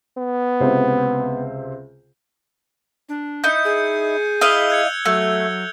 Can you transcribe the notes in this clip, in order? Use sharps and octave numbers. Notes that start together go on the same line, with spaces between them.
B3
C#2 C3 C5
D4
D#4 E4 G6 C#7
G#4
E4 D#5 F5 E6 F7 G7
F#6 G#6 C#7
F#3 A3